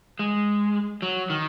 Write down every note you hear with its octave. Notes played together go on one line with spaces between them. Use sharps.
G#3
F#3
D#3